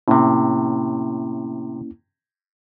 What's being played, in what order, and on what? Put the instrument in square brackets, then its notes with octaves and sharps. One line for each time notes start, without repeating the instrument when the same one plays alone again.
[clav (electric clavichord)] A2 C3 [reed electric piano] A#3 C#4 E4